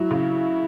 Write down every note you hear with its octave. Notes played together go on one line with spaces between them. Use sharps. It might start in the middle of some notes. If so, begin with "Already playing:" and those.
Already playing: F#3 E4
C#3